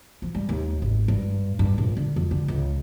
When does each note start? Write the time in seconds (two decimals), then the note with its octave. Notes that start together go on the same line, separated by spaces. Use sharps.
0.22 F3
0.35 G3
0.49 D#2
0.82 G#1
1.08 G2
1.59 G2
1.78 A#1
1.97 D3
2.16 F2
2.31 D3
2.48 C#2